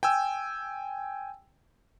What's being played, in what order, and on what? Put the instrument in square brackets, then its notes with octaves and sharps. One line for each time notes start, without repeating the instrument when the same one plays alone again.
[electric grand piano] G5 G#5 E6